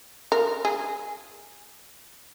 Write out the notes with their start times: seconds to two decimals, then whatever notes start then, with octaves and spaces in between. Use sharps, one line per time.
0.32 A#4
0.65 G#4